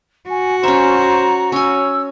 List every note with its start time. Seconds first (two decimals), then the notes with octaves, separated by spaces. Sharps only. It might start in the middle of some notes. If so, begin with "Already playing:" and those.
0.29 F#4 G#5
0.63 C#4 C5 E5 A#5
1.52 C#4 C#5 G#5 E6